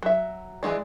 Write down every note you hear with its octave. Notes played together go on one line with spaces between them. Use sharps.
F#3 E5
E3 F3 G#3 D4